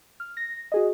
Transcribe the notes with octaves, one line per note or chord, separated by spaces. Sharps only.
F6
A#6
F#4 G#4 D#5